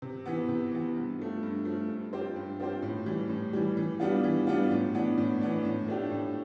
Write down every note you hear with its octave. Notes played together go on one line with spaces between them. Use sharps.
C3
E3 B3
C3
E3 B3
G2
F3 A3
G2
F3 A3
G2
F3 C4 G4 C5
G2
F3 C4 G4 C5
A2
E3 G3
A2
E3 G3
E3
G3 B3 D4 F4
E3
G3 B3 D4 F4
A2
E3 B3 D4
A2
E3 B3 D4
A2
F3 A3 D4 G4
A2